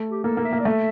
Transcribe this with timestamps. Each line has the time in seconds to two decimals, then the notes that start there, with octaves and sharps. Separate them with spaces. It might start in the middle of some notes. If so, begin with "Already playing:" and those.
Already playing: A3
0.09 G4
0.24 A#3 A4
0.37 A#3
0.45 E5
0.52 A#3
0.60 D5
0.65 A3 E5